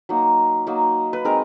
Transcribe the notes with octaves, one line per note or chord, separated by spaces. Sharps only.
F#3 A#3 D#4
F#3 A#3 D#4
B4
G#3 C4 D#4 A#4